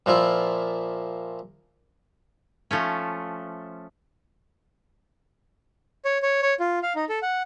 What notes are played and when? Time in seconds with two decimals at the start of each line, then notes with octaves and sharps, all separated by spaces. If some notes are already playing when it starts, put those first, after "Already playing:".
0.06 A#2 F3 E4
2.71 F3 A3 C#4
6.05 C#5
6.22 C#5
6.42 C#5
6.60 F4
6.83 F5
6.96 D#4
7.09 A4
7.22 F#5